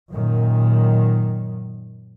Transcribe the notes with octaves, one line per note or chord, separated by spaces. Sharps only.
F#2 A#2 D#3